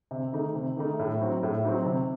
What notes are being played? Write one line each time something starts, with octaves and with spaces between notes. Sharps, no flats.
C3
D#3 A3 D#4
C3
D#3 A3 D#4
A2
F#3 C4 D#4 F#4
A2
F#3 C4 D#4 F#4
C3